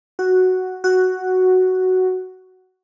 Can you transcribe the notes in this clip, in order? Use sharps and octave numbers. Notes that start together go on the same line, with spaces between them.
F#4
F#4